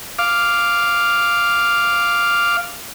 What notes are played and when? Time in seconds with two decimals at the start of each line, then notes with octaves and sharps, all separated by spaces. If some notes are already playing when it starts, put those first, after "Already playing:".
0.19 F5 D6